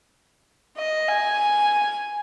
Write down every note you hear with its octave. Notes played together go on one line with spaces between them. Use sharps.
D#5
G#5